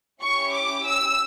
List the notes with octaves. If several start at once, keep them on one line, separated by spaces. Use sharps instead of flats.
C#4 E4 G4 C#6
D6
E6